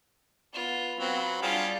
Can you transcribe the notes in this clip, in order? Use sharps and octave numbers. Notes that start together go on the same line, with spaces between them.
B3 F4
F#3 B3 C4 F4 B5
G3 D4 F4 G#4 F5